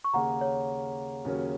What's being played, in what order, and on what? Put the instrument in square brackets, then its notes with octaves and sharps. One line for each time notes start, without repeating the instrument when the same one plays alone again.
[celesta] C#6
[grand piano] D#2 C#3 A#3 [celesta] F#5 A#5
[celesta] C#5
[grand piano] D#2 C#3 F#3 C#4 A#4